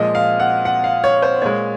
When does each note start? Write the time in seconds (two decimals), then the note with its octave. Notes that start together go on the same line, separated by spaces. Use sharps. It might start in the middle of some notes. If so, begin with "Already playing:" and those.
Already playing: A#2 F3 G#3 D#5
0.15 F5
0.40 F#5
0.65 F#5
0.84 F5
1.04 C#5
1.22 C5
1.42 A#2 G#3 C#5